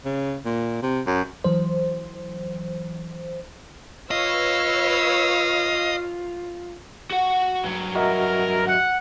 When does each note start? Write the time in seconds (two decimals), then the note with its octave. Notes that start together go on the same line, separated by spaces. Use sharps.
0.05 C#3
0.45 A#2
0.82 C3
1.07 F#2
1.44 E3 F#3 C5
4.11 F4 B4 C#5 D#5 F5 E6
7.11 F#4 F#5
7.63 G2 F#3
7.95 F#4 A#4 D#5 E5
8.67 F#5